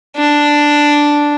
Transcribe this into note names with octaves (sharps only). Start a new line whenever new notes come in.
D4